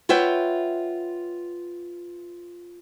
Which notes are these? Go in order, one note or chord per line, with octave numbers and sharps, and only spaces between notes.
F4 B4 C#5 E5 F#5 G5